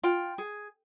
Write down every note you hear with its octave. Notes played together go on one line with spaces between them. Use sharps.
F4 G5
G#4